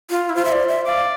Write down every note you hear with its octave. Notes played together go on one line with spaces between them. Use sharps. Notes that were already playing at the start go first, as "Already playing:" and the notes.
F4
E4
F4 C5
E5
D5
E5
D5 F5